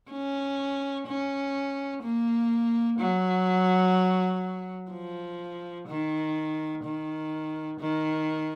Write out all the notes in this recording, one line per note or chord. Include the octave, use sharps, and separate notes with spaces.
C#4
C#4
A#3
F#3
F3
D#3
D#3
D#3